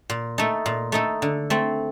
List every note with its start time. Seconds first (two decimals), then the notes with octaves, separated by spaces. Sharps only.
0.10 A#2
0.38 A3 D#4 A4
0.66 A#2
0.92 A3 D#4 A4
1.22 D3
1.50 A3 C4